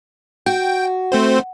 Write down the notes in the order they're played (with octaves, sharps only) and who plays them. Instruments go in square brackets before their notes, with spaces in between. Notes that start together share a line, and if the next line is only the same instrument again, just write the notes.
[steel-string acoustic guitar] F#4 [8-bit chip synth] G5
[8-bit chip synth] A3 C4 C5